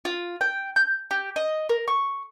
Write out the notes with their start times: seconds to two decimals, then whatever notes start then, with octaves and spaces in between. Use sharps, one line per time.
0.05 F4
0.41 G5
0.76 G6
1.11 G4
1.36 D#5
1.69 A#4
1.88 C#6